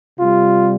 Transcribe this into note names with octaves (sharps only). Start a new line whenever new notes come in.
C3 G3 F4